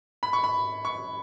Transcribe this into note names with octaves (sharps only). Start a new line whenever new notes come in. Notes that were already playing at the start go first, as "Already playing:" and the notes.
B5
C#6
B5
C#6